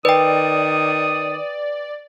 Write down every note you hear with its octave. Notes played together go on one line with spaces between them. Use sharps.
D#3 B4 D5 G5 D#6